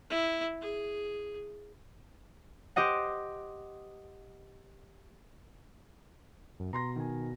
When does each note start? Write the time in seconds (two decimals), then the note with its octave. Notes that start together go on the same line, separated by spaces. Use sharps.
0.11 E4
0.61 G#4
2.76 G4 C5 D#5 F#5
6.60 F#2
6.73 B2 A#5 C6 A#6
6.96 D#3 G#5